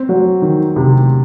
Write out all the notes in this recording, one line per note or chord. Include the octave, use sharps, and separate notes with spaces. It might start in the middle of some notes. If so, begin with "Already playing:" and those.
Already playing: C4
F#3
D#3
C3